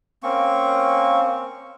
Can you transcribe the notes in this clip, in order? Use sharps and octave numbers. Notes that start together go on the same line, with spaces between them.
A#3 C4 C#4 C#6